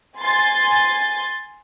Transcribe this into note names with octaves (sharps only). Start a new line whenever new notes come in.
G#5 C6 A6